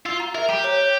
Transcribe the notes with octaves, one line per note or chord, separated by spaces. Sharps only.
F4 E6
A#5
A#4 E5
G4 A#5
C#5
C#5